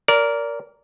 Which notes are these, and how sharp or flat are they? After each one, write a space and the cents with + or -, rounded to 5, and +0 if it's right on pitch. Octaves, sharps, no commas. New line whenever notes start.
A#4 +0 D5 -25